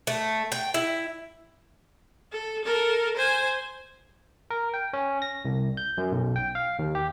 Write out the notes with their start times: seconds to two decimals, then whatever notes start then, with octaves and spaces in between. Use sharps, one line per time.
0.07 A3
0.52 G5
0.74 E4
2.32 A4
2.65 A4 A#4
3.17 C5 G#5
4.50 A#4
4.74 G5
4.93 C#4
5.22 A#6
5.45 C2
5.77 G6
5.98 F#2
6.12 B1
6.36 G5
6.55 F5
6.79 D#2
6.95 G4